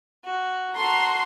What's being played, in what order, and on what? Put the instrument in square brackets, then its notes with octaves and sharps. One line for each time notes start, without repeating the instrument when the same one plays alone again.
[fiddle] F#4
[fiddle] F#4 A4 [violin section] A#5 C6